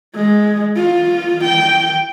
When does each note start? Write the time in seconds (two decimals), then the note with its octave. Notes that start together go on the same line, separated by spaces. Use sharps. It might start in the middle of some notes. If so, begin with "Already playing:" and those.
0.15 G#3
0.76 F4
1.44 G5